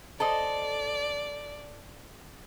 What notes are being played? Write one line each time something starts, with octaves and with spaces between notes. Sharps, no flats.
A4 C5 D5 D#5